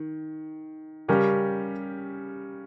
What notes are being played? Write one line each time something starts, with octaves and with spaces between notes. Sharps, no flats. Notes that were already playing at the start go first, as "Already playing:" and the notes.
Already playing: D#3
C#3 G3 C#4 G4 A#4